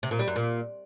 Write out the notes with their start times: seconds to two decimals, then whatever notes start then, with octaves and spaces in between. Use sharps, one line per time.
0.03 C3
0.11 A#2
0.19 G3
0.28 F#2
0.36 A#2